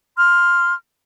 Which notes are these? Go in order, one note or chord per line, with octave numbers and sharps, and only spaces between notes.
C6 F6